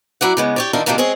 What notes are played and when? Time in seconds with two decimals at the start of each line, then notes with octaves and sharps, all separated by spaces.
0.21 F#3 E4 D5 F#5
0.37 C#3 G#3 B3
0.56 G4 C#5 D5
0.73 D3 D#3 D4 E4 F4 A#4
0.86 C3 D#3 F3 G3 A#3 D4
0.98 G#3 C4 G#4 C#5